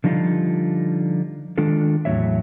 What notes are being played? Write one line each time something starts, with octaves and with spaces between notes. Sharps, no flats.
D3 F3 G3 D#4 F4
D#3 G#3 D4 F4 A4
E2 A2 F#3 G3 C#5 E5